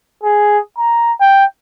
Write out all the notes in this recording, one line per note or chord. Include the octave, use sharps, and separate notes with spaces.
G#4
A#5
G5